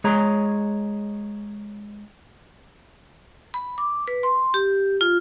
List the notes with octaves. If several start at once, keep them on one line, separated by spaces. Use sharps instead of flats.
G#3 G#4 C#5 A#5
B5
D6
B4
C6
G4
F4